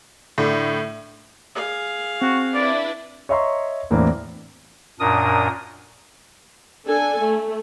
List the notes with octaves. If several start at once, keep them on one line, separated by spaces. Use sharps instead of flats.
A2 D3
G#4 F5
C4 F#4
D4 E4 B4 D5
C#5 D#5 E5 A#5 C6 C#6
E2 A2 E3 A#3 C4 D4
F#2 A#2 D4 A#4 D#6
D4 A4 G#5
A3